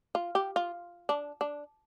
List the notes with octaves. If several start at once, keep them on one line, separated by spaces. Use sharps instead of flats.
F4
G4
F4
D4
D4